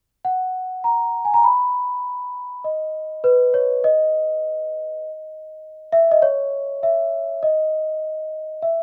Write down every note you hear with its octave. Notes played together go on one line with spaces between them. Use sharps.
F#5
A#5
G#5
A#5
B5
D#5
B4
C#5
D#5
E5
D#5
C#5
E5
D#5
E5